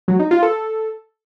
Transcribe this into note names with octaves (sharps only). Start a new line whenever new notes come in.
F#3
D#4
F4
A4